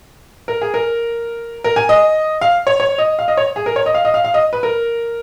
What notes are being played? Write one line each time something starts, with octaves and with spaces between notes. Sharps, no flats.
A#4
G#4
A#4
A#4
G#5
D#5
F5
C#5
C#5
D#5
F5
D#5
C#5
G#4
A#4
C#5
D#5
F5
D#5
F5
F5
D#5
B4
A#4